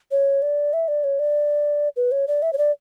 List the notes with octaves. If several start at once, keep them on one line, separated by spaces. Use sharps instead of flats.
C#5
D5
E5
D5
C#5
D5
B4
C#5
D5
E5
C#5
D5